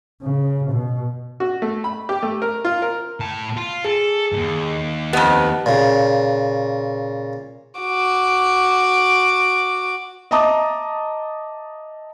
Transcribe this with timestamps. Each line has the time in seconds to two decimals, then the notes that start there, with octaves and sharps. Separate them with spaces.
0.22 C#3
0.71 B2
1.40 F#4
1.62 A3
1.84 B5
2.09 G4
2.23 A3
2.42 A#4
2.65 F4
2.82 A#4
3.20 A2 A5
3.57 F4
3.85 G#4 A4
4.32 D#2 G#2
5.13 F2 B3 G4 D#5 A5
5.66 A#2 C#3
7.80 F#4 D6
10.31 D#5 E5 A5 A#5 D6 D#6